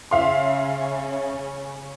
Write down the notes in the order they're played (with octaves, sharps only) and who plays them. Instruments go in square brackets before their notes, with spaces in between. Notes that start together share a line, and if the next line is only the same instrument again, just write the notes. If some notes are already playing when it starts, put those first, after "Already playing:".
[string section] C#3 C#4 [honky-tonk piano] E5 F5 C6